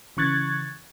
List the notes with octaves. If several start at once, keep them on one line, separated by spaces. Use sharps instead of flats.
C#3 E3 C#6 F#6 G#6 A6